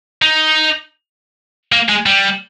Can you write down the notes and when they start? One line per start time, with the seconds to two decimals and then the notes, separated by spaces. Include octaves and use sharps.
0.22 D#4
1.72 A#3
1.89 G#3
2.06 G3